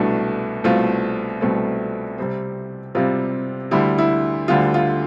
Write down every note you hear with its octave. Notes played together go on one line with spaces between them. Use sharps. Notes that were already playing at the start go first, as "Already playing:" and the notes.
Already playing: C2 B2 A3 D4
C2 B2 A3 C4 F4
C2 B2 A3 C4
C3 G3 C4
C3 G3 C4 F4
D2 D3 G3 E4
E4
D2 D3 G3 F4
F4